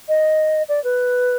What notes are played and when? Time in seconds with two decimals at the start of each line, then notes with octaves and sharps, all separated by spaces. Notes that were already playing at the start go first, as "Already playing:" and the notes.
0.09 D#5
0.69 D5
0.84 B4